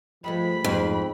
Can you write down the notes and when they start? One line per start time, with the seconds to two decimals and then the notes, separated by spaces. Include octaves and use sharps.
0.24 G2 F3 G#3 A3 B5
0.64 F2 G#2